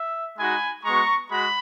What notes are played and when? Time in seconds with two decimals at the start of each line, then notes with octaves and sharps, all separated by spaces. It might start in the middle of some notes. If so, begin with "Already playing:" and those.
Already playing: E5
0.38 G#3 D#4 F#4 G#5 B5
0.84 G#3 B3 F#4 A#5 C#6
1.30 G#3 F#4 B5